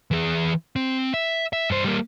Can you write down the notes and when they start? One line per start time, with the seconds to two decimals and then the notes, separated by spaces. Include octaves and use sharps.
0.11 E3 G#4
0.76 C4
1.14 E5
1.53 E5
1.70 G2 C5
1.85 G3 A#3